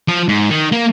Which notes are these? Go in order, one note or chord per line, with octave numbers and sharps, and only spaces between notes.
F3
G#2
D#3
A#3